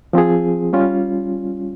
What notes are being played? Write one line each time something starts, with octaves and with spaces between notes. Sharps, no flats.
F3 C4 F4 G#4
G3 C#4 F4